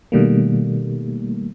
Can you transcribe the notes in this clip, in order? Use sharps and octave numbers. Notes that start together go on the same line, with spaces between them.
B2 D#3 G3 A3 A#3